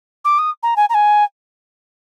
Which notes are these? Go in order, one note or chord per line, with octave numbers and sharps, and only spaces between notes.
D6
D#6
A#5
G#5
A#5
G#5